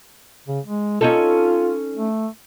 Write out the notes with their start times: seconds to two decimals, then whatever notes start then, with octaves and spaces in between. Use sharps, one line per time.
0.47 C#3
0.65 G#3
1.01 C#4 D#4 F4 A4
1.97 A3